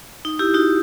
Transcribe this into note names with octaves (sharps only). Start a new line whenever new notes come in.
D#4
E4 G4
D#4 F#4